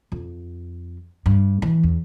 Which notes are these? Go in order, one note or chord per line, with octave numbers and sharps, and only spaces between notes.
F2
G2
E3
E2